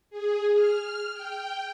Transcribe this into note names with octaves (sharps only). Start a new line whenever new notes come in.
G#4
F6
G5